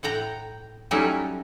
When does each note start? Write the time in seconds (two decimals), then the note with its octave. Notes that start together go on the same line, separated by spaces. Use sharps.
0.03 A2 F#5 G5 A#5
0.91 F#3 G3 A3 C#4 D#4 E4